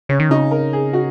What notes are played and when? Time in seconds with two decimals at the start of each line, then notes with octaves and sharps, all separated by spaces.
0.09 C#3 C#4
0.20 D#3
0.30 C#3 D#4
0.51 A#4
0.73 G#4
0.93 F#4